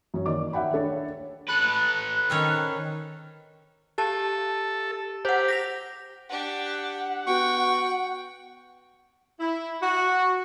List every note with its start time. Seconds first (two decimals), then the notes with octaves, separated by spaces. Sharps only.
0.14 F#2 C#5
0.26 D#3 A#3 D5 D6
0.53 E5 F#5 G5 B5
0.73 D4 A4 C#5
1.49 A4 B4 F#6
2.30 D#3 C4 C#4 C#5
3.98 G4 A4 A5
5.25 G4 C5 F#5
5.48 A#6 B6 F7
6.29 D4 G4 F#5
7.27 B3 F#4 G5 C#6
9.40 E4
9.82 F#4